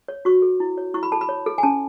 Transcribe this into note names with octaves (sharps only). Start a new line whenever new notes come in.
C#5
F#4 C#6
A4
E4
C#5
E4 C#6
B5
A4 A5
B5
C#5
A4
G#5
C#4 A5